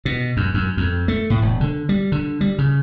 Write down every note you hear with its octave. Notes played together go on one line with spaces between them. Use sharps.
B2
F#2
F#2
F2
A3
A2
E1
D3
G3
D3
G3
C#3